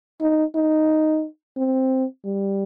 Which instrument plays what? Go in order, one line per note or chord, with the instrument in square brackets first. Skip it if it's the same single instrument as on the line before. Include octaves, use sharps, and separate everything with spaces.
[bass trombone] D#4
D#4
C4
G3